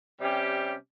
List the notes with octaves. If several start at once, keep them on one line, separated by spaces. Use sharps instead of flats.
C3 G3 C#4 G4